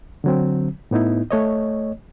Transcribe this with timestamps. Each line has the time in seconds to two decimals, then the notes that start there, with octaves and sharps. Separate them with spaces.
0.24 D3 F#3 C4
0.91 A2 B3 D#4 E4
1.31 A3 C#5 D#5